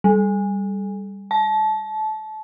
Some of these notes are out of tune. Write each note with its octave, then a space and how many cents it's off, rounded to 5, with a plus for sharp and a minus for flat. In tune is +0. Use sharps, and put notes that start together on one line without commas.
G3 +5
A5 -25